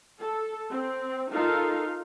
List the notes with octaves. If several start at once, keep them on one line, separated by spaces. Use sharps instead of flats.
A4
C4
D#4 F4 A4 A#4 F5